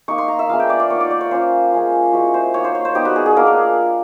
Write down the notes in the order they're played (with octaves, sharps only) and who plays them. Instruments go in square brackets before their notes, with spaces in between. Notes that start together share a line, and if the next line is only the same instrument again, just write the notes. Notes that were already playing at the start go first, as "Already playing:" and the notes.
[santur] A#3 D#4 C#6
C6
A#5
E5
G#3 B3 D4 F4 F5
G5
D5
D5
A#3 D#4 C#5
D5
D5
C#5
A#3 C#4 F4 C5
G#3 C#4 F4
G#3 C#4 E4 F#4
C5
A#3 D#4 C#5
C5
C#5
C5
G3 B3 D#4 G4
F#4
G#4
G#4
A#3 D4 F4 A#4
A#4